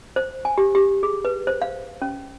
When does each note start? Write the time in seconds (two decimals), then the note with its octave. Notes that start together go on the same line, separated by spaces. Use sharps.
0.16 C5
0.45 G#5
0.58 G4
0.75 G4
1.03 G#4
1.25 B4
1.47 C5
1.62 F5
2.02 C#4